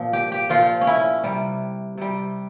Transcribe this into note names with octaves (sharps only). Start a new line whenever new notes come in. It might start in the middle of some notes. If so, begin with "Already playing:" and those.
Already playing: A#2 F3
G4
G4
A#2 F3 F4
C#4
E4
C3 G3
C3 G3